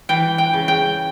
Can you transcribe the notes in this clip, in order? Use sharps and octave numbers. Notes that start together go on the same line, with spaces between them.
E3 G5
G5
C#3
G5